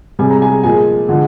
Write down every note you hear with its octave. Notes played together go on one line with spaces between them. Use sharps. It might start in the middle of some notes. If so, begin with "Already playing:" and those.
C3 G3 G#4 G#5
A#5
G#4 G#5
A#2 F3 G#3 G#4 G#5
D3 F3 G#3